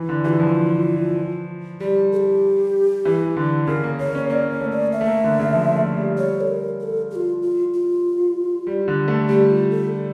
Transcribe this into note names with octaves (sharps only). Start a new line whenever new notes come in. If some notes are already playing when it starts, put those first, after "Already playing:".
Already playing: E3
D3
E3 F4 G4
F3
G3 G4
A4
G4
E3
D3
C#3 A#4
A#3
A#3 C#5
C#4
A#3 D5
C#5
A3
D5
E5
A3
A#3
D3
C#3
F3
A3
G3
G3 C#5
A4
A#4
A#4
A4
G4
F4
F4
F4
G3
D3
A3
G3 G4
F4
A4